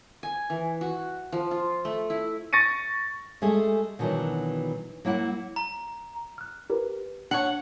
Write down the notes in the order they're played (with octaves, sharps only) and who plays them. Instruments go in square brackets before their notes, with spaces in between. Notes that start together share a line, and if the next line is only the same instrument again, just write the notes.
[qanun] G#5
E3
F#4
F3
F4
A3
E4
[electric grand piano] C#6 A6 A#6 C#7 D#7
[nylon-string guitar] G#3 A3 G4 G#4
B2 D#3 E3 F#3 D4
F#3 A#3 E4 F#5
[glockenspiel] A#5
[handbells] F6 F#6
G4 A#4 B4
[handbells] D4 [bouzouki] C#5 F#5